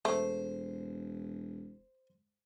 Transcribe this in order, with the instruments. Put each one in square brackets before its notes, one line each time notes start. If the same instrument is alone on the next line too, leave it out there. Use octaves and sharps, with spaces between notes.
[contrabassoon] E1 [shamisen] A3 [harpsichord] C5